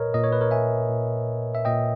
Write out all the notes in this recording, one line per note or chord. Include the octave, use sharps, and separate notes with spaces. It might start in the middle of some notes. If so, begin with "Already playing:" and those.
Already playing: A#2 A#4 B4 C#5 D#5
A#2 D#5
C#5
B4
A#4 C#5
E5 G#5
A#2
E5
A#2 D#5 G5